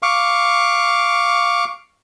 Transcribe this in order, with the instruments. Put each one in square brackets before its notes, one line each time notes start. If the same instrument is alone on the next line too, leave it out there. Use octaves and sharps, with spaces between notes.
[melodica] F5 C#6 D6